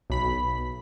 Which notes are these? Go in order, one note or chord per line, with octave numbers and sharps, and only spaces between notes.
B1 B5 B6